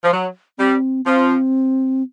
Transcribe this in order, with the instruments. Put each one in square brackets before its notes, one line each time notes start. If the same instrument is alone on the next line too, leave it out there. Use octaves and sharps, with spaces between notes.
[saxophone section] F3
F#3
[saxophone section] G3 [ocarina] C4
[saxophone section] F3 [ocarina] C4